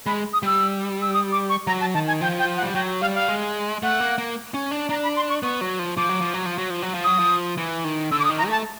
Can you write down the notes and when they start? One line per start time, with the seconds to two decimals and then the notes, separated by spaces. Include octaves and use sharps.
0.06 G#3 B5
0.33 D#6
0.43 G3 E6
1.02 E6
1.14 D#6
1.32 D6
1.50 C#6
1.67 F#3 A#5
1.81 A5
1.94 D#3 A5
2.08 G#5
2.21 F3 G5
2.39 G5
2.57 F#5
2.63 G3
2.75 F#3 G5
3.01 G3 F5
3.15 F5
3.28 G#3
3.82 A3 F#5
4.00 A#3
4.18 A#3
4.54 C#4
4.71 D4
4.89 D4 A#5
5.03 B5
5.16 C6
5.30 C#6
5.43 B3 C#6
5.61 F#3
5.79 F3
5.97 F3 D6
6.09 F#3
6.21 F3
6.34 F#3
6.46 F3
6.58 F#3
6.70 F3
6.82 F#3
6.94 F3
7.04 F#3 D#6
7.19 F3
7.58 E3
7.84 D#3
8.12 D3 E6
8.19 D6
8.25 D#6
8.29 D#3
8.38 A#5
8.47 A3 A5